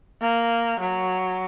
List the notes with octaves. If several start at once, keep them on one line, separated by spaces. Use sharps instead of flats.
A#3
F#3